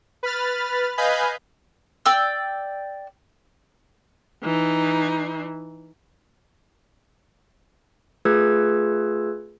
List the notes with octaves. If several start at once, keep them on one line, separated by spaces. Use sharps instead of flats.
B4 B5 F6 A6
B4 D#5 F5 G#5 B5 G6
D5 G5 E6
E3 D#4
A3 F4 G#4 B4 E6 G#6